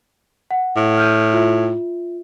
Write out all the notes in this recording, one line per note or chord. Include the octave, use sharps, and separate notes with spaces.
F#5
A2
F6 G6 D#7
F4 E5